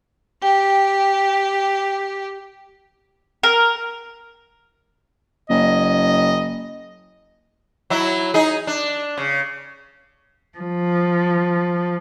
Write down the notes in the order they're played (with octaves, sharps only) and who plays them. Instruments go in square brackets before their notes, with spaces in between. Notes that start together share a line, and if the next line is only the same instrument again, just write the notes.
[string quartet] G4 [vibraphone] G5
[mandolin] A#4
[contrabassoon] F#1 [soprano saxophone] D#5
[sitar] F#3 E4
D#4 G#4
D4
C#3
[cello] F3